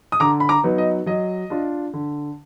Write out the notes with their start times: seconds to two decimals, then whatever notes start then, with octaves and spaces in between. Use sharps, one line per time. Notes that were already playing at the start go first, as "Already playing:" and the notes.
0.12 D#6
0.20 D3 A#5 D6
0.40 B5
0.49 A#5 D6
0.64 F#3 B3 D#4
0.78 D#5
1.06 F#3 D#5
1.50 D4 F4
1.93 D3